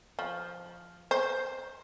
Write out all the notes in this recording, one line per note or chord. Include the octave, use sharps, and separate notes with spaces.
F3
C5